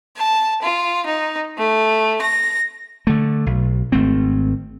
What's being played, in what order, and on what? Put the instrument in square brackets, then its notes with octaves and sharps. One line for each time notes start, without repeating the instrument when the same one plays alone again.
[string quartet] A5
F4
D#4
A3
A#6
[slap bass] D3 A3
B1
G#1 A3 C4